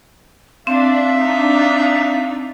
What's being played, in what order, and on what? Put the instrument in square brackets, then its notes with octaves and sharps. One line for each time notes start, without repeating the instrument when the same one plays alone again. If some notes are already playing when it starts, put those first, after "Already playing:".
[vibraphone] C4 [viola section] D4 [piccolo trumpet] E5 [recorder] F5
[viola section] D4 D#4